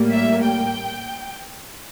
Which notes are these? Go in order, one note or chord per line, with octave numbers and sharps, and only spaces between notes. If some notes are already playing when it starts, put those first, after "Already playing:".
Already playing: A2 G3 A#3
E5
G5